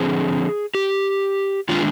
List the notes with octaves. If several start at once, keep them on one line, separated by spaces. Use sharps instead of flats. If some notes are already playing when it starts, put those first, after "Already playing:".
Already playing: D3 F3 C4 G#4
G4
D#3 G#3 D4 F4